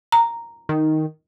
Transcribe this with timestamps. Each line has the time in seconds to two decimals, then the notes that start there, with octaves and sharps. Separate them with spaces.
0.12 A#5
0.69 D#3